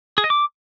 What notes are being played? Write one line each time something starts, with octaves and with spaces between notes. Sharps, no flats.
G#4
D#5
D6